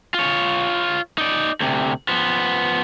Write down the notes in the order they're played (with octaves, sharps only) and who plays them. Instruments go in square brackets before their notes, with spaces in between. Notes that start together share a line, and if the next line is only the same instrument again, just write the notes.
[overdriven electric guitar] F4 C#5
D#4 D5
D2 C3
F3 B3